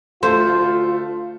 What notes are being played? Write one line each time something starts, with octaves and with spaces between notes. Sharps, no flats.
D2 A3 F4 C5